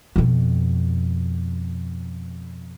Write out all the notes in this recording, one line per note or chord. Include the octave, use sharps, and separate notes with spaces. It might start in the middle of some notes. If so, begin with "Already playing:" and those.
F2 B2